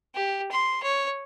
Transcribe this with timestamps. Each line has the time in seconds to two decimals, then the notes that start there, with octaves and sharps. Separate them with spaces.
0.14 G4
0.51 C6
0.83 C#5